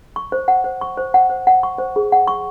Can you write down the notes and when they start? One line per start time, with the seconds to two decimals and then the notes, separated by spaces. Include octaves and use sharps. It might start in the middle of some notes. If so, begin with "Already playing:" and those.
0.16 C#6
0.32 C5
0.48 F#5
0.64 C5
0.81 C#6
0.97 C5
1.14 F#5
1.30 C5
1.47 F#5
1.63 C#6
1.78 C5
1.96 G#4
2.12 F#5
2.27 C#6